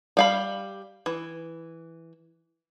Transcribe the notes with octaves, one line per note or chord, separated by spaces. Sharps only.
G3 F5 B5
E3